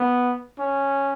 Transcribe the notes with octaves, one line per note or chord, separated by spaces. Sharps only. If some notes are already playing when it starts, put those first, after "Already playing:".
Already playing: B3
C#4